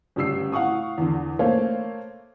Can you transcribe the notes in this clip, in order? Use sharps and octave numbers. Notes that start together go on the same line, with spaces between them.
G1 C#3 G3 E6 C7
A2 F5 F#5 C#6 D#6
E2 D3
A3 A#3 C5 C#5 F5